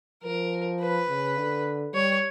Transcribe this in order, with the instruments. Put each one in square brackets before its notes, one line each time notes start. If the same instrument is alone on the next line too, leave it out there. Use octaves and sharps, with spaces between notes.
[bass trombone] F3 [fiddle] A#4
[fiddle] B4
[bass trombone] C#3
D3
[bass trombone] G3 [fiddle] C#5